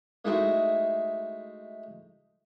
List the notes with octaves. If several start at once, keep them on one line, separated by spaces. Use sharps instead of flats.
G#3 A3 D#4 E4 F#4 G#4